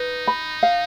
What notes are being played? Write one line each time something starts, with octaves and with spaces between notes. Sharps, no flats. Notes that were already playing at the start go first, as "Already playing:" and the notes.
Already playing: D#4 B4
B5
F5